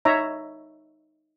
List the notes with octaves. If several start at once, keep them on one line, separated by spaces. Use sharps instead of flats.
D#4 C#5 E5 A#5